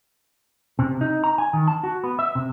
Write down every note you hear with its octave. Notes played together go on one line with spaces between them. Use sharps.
C3
D#4
A#5
G#5
D#3
A5
F#4
B3
E5
C3